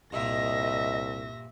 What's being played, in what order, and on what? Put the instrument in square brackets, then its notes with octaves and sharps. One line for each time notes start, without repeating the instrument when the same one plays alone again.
[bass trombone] C2 [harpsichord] G2 A#2 [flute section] D#5 [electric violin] E5 A#6